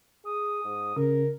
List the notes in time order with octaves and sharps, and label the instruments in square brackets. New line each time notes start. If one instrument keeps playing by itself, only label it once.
[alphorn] G#4 [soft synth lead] D#6
[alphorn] G#2
[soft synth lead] C#3 [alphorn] A#4